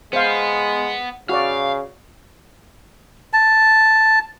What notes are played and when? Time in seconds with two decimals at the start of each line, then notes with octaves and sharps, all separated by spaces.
0.13 G#3 B3 C5 F5
1.29 C#3 F#4 D5 F5
3.33 A5